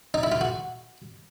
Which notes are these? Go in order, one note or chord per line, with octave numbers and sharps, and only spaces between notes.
D#4
E4
F4
F#4